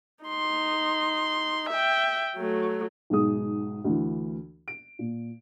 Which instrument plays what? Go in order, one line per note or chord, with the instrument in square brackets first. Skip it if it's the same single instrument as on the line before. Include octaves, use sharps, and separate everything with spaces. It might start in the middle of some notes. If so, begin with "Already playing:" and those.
[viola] D#4 C6
E5 G5
F#3 A3
[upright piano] B1 G#2 G#4 D#6
D2 E3
D7
A#2